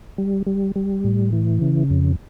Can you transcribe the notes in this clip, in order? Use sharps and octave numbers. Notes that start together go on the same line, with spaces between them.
G3
G3
G3
A2
E3
C#3
F2